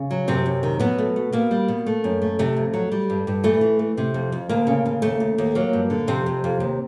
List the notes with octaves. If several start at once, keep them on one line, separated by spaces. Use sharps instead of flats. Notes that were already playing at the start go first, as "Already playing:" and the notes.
Already playing: C#3
F#3
F#2 C3 C4
F#2
D#3
B2 F#3 B3
A3
A3
B2 A#3
G3
B2
A3
F#2
A3
C3 A3
F2
F#3
G3
G2
G2
E3 A3
E3
A3
C3
F2
F2
D2 A#3
C#3
C#3
D#2 A3
D#2
D#2
F#3 A#3
G2
D3
F2 C3 C4
F2
F2
D#2